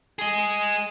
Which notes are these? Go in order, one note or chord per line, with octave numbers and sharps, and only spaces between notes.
G#4 D#5